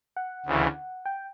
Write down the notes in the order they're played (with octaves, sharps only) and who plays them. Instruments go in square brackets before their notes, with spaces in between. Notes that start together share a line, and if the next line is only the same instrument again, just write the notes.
[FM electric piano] F#5
[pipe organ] D2 C#3 E3
[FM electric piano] G5